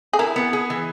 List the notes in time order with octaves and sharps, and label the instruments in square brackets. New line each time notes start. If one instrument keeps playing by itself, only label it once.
[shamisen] G#4
[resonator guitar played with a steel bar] E4 [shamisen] A#4
[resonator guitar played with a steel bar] B3
G#4
E3